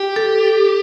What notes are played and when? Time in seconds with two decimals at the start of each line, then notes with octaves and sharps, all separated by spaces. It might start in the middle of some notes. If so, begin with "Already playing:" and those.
Already playing: G4
0.16 A4